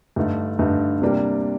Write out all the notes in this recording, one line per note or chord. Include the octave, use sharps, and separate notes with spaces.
G2 D3 A3 D#4
G2 D3 A3 D#4
C3 G3 A#3 D4